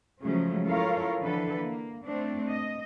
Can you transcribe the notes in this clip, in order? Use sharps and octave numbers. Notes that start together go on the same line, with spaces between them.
C#3 F3 F#3 G#3 A3 C#4
E4 F4 A4 A#4 C#5 F5
D3 E3 F3 A4 B4
A#3
A3 C4 D4
D#5